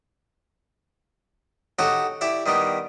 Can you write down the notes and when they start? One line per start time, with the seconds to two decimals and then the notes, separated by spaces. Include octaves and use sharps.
1.79 D#4 F#4 G4 A4 C#5 F#5
2.21 E4 G4 D5 E5
2.46 D#3 G3 B3 D#4